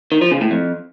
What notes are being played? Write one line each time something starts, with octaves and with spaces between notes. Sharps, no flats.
D#3
F3
C#3
A2
F2